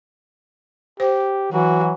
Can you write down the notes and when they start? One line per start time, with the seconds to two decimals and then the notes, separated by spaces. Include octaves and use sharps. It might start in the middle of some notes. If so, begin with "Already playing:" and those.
1.00 G4 C5
1.52 E3 F#3 F#4